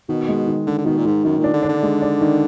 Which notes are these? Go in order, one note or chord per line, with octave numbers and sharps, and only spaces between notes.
B2 D#3
G#3
D#3
D3 G#3
D3
B2 D#3
A#2
G#2 D#3
F#2 D#3
A#2
D4
D3
D4
D3
G#3
D4
D#3